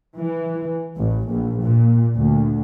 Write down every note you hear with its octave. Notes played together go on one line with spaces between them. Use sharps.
E3
A1
A#1
A#2
D2